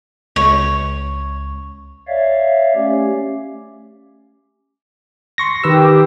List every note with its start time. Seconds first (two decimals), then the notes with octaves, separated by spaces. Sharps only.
0.36 C#2 C#5
2.08 C#5 D5 E5 F5
2.75 A3 C#4 G4
5.38 C6 C#6 A#6
5.64 D#3 G4 B4 E6